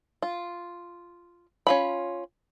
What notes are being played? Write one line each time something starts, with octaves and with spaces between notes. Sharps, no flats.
F4
C#4 F4 B5